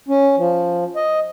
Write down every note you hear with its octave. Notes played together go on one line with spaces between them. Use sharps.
C#4
F3
D#5